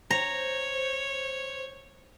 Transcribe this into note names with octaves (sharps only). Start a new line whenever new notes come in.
C5 C#5 A#5